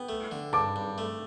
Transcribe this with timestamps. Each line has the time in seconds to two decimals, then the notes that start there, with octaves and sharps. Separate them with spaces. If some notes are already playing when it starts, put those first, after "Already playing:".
Already playing: B3 G5
0.09 A3
0.31 D3
0.53 G2 A5 D6
0.76 G2
0.98 A3